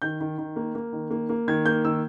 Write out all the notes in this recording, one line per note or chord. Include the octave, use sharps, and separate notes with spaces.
D#3 G6
D#3
D#3
A#3
A#3
D#3
A#3
A#3
D#3 G#6
A#3 G6
D#3 E6